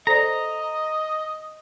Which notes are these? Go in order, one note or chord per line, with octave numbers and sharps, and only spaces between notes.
A4 C5 D5 D#5 A#5